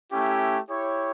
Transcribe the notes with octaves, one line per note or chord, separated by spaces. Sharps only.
A3 C#4 E4 G4
E4 G4 C#5